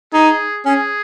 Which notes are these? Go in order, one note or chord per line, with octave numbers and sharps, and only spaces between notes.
D#4 G#4
C#4 G#4